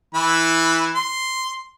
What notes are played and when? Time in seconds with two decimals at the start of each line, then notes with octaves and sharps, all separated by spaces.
0.15 E3 E4 B5
0.95 C6